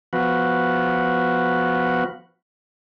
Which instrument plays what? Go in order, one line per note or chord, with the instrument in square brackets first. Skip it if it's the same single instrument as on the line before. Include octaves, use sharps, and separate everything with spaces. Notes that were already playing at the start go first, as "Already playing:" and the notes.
[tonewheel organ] F3 B3 F#4